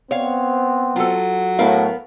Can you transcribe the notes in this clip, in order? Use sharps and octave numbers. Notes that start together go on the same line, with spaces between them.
B3 C4 C#5 F5
F#3 F4 A4
A2 B3 A#4 F5